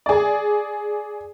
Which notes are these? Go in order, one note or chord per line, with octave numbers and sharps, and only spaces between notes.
G#4 D5